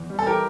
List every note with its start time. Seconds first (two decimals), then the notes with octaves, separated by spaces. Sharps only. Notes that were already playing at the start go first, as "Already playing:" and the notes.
Already playing: E2
0.10 G3
0.19 A4
0.26 E3 G4 A#4